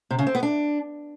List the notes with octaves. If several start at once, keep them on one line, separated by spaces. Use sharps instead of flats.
C3
C#3
C4
B3
D4